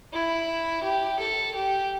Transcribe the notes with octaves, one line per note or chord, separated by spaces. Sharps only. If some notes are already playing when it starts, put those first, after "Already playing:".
E4
G4
A4
G4